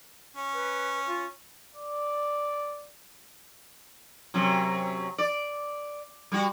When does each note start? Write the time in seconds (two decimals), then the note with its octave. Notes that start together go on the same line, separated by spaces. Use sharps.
0.36 C#4
0.53 B4
1.06 F4
1.75 D5
4.34 F#2 C3 F#3
5.18 D5
6.32 G3 F#4